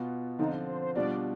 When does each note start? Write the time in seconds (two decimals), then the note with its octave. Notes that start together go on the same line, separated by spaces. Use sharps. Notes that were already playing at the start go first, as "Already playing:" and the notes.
Already playing: B2 B3 F4
0.39 D3 F3 C4 D#4 F4
0.67 C5
0.81 C5
0.95 B2 G3 D4 F4 D5